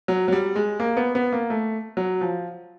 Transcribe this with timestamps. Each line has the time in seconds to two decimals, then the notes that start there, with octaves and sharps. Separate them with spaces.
0.08 F#3
0.28 F#3
0.32 G3
0.56 G#3
0.80 A#3
0.97 B3
1.15 B3
1.33 A#3
1.50 A3
1.97 F#3
2.21 F3